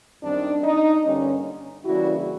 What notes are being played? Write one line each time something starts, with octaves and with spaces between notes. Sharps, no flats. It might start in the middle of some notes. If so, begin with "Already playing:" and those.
F#2 D#3 G3 C4 D4
D#4
G2 D3 G3 A#3 C#4
C#3 E3 G3 A#3 D4 E4 F#4